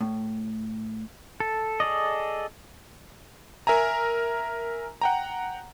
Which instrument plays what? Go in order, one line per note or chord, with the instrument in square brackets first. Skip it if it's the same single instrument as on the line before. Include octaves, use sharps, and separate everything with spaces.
[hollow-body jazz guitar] A2
[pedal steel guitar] A4
G#4 A4 D5 D#5
[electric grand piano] A#4 E5 G#5 A#5
F#5 G5 A#5